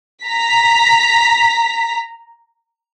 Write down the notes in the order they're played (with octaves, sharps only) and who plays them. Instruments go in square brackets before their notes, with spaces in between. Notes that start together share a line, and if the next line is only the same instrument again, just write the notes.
[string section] A#5 B6